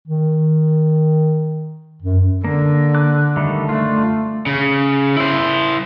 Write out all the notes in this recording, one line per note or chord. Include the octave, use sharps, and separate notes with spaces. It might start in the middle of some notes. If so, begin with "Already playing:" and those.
D#3
F#2
D3 A#3
D6 F#6
D#3 G3 A3
A3 D4 F4
C#3
E4 C5